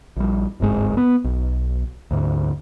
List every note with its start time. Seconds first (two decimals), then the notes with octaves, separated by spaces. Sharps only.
0.16 A#1 G3
0.60 D1 G1 G#2 G#3
0.97 B3
1.24 B1
2.11 D2 G#2